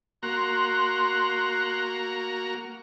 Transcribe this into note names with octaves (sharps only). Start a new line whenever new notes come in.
A#3 F#4 A#5 C6 F#6